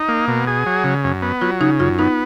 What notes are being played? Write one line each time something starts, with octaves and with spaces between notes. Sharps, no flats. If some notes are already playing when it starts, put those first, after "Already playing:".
Already playing: D#4
A#3
B2
G#4
F#3
C#3
F#2
B3
F#3 F4
C#3 D#4
F#2 F4
B3 D#4